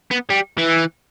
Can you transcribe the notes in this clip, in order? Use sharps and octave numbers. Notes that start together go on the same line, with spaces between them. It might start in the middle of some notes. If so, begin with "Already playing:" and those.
B3
G3
E3